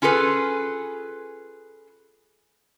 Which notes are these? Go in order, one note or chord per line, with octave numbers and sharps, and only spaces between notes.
C#4 F4 G#4 A4 B4